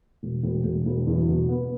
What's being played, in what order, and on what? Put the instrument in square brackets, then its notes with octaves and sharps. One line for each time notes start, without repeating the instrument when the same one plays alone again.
[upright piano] E1
E1
E1
E1
E2
B2
B3